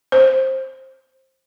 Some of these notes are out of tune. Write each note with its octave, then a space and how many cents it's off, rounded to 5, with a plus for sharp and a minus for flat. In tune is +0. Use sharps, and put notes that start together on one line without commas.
C5 +15